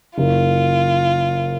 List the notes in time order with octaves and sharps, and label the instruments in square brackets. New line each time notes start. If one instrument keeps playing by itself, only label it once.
[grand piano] F#1 [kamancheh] F4